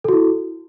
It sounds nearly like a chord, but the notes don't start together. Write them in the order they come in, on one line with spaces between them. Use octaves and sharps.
A4 F#4 E4